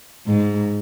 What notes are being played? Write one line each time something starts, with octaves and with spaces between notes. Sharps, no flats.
G#2